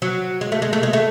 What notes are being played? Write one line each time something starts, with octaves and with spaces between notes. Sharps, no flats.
F#3
G#3
A3
G#3
A3
G#3
A3